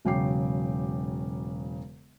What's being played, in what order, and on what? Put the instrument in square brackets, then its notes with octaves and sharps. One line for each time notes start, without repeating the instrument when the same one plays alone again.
[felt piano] E1 C#3 F#3 G5 D6 C7